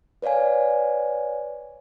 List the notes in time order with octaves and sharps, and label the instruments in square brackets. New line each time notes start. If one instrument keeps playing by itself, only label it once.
[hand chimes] B4 C#5 D5 F5 G#5